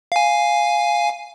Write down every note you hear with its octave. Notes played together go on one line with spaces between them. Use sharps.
F5 G#5